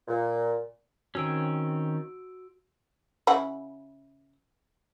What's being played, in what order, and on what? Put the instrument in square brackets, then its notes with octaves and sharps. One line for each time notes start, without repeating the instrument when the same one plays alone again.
[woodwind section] A#2
[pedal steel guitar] D#3 C4 C#4 [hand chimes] F#4 E6 D7
[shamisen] C#3 E4 F#5